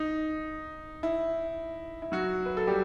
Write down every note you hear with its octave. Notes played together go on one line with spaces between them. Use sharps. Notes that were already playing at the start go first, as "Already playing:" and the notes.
Already playing: D#4
E4
E4
F#3 F#4
B4
A4
G3 G4